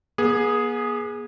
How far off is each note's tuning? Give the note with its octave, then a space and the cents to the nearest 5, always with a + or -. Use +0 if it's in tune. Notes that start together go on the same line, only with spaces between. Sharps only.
B3 -45 G#4 +0